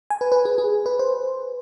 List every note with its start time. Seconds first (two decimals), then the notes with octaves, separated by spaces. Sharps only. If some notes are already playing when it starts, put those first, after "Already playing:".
0.10 G#5
0.21 B4
0.32 B4
0.45 G#4
0.58 G#4
0.86 B4
0.99 C5